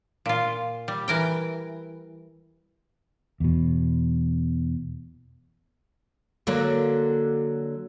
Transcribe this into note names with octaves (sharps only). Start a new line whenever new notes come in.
A#2 F4
G3
E3 A#4 G5
E2 B2
D3 F#3 A#3